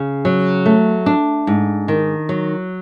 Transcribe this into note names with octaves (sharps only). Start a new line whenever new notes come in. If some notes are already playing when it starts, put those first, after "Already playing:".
Already playing: C#3
F#3
A3
D4
G#2
D#3
F#3